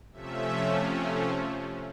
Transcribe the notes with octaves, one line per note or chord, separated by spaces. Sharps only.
C3 F3 A3 C#4 E5